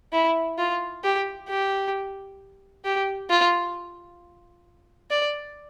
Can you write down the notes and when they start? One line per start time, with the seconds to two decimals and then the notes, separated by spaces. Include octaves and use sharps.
0.13 E4
0.58 F4
1.04 G4
1.48 G4
2.85 G4
3.30 F4
5.11 D5